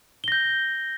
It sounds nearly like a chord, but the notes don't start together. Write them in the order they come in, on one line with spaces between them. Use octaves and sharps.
G7 A#6 G6